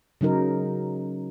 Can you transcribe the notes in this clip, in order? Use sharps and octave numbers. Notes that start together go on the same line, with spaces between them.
C#3 F#3 D#4 A#4